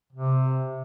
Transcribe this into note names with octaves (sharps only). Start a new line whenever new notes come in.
C3